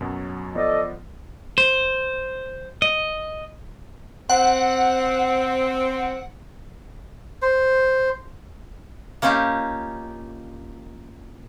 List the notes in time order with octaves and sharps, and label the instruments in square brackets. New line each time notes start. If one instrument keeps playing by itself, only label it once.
[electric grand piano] F#2 B2 F#3
[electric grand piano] F3 B3 [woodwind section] A4 D5 D#5
[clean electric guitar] C5
D#5
[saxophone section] C4 [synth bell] F#5
[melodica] C5
[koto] A#3 C#4 D#4 F4 G4